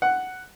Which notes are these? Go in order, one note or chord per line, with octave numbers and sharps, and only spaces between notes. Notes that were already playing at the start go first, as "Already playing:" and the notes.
F#5